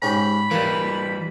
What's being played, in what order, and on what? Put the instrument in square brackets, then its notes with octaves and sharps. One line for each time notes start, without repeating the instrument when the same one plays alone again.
[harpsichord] G#2 C#4 G4 [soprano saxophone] B5
[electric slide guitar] E3 G3 [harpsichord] A#3